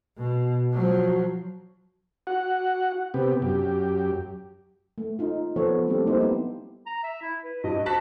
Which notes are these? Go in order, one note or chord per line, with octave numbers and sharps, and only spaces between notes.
B2
F3 F#3
F#4 F#5
C3 B3 G4
F#2 G4
A3
D#4 F4
F3 B3 A4 C5 C#5
G3 A3 C4 D4 G4 A4
G3 A#3 D#4 E4 G4 C5
B3 C4 E4 G4
A#5
E5
E4
B4
G2 D#5
F#4 A5 F#6 B6